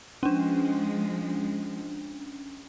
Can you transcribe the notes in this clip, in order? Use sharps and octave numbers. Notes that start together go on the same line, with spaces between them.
F3 G#3 C#4 D4